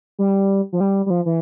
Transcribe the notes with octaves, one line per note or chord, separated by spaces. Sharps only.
G3
F3
G3
G3
F3
E3